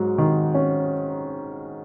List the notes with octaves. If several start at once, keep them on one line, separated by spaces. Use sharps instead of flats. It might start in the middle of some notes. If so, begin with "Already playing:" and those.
Already playing: G#2 F#3
D#3
C#4